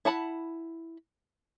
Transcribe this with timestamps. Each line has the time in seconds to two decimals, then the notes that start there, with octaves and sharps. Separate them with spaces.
0.05 E4 F#5 A5 B5